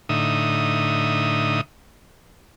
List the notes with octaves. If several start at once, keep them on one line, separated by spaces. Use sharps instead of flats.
A2 D3 D#4 E5 D#6